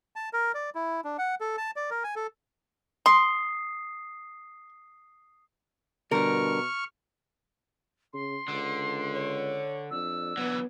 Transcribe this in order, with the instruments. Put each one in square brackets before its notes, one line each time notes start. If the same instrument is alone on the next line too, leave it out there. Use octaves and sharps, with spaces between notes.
[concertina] A5
A#4
D5
E4
D4
F#5
A4
A5
D5
A#4
G#5
A4
[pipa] C6 [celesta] D#6 C7
[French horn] B2 [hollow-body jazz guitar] D3 G3 D4 [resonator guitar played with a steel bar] A#4 [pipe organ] C#6 F6
[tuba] C#3 [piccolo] C6
[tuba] C#2 [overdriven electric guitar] D3
[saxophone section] C#5
[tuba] F2 [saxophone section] D4 [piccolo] E6
[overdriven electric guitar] E3 F#3 [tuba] B3